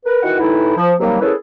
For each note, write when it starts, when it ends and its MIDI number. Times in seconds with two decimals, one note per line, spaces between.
0.06 0.20 70
0.06 0.20 71
0.23 0.36 51
0.23 0.36 52
0.23 0.36 66
0.23 0.36 78
0.40 0.75 45
0.40 0.75 52
0.40 0.75 63
0.40 0.75 64
0.77 0.92 53
1.00 1.20 48
1.00 1.20 51
1.00 1.20 54
1.00 1.20 55
1.00 1.20 58
1.21 1.33 58
1.21 1.33 61
1.21 1.33 64
1.21 1.33 68
1.21 1.33 69
1.21 1.33 71